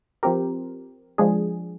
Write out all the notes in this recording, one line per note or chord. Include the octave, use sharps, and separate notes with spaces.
F3 C4 G4 A#4
F3 G#3 D4 G#4